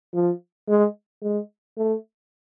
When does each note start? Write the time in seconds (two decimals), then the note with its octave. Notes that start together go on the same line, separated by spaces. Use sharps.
0.14 F3
0.68 G#3
1.22 G#3
1.78 A3